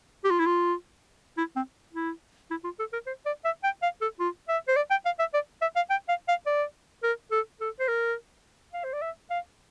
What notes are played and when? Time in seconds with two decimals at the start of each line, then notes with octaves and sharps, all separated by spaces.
0.24 G4
0.31 F4
0.39 E4
0.46 F4
1.38 E4
1.56 C4
1.93 E4
2.51 E4
2.64 F4
2.79 A4
2.93 A#4
3.06 C5
3.26 D5
3.45 E5
3.63 G5
3.82 F5
4.01 A4
4.20 F4
4.49 E5
4.68 C5
4.76 D5
4.90 G5
5.05 F5
5.19 E5
5.34 D5
5.62 E5
5.76 F5
5.90 G5
6.09 F5
6.28 F5
6.46 D5
7.03 A#4
7.31 A4
7.61 A4
7.80 C5
7.88 A#4
8.74 F5
8.84 C5
8.93 D5
9.02 E5
9.30 F5